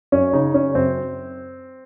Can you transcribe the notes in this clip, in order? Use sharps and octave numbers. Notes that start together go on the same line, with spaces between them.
F#2 C#4
C#3 D#4
C#3 C#4
F#2 C4